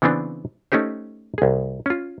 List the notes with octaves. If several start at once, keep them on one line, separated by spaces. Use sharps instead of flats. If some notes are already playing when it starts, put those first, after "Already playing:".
C#3 E3 B3 C4 D4
A3 C#4 D#4 G4 C5
C2 G#4
C#4 F4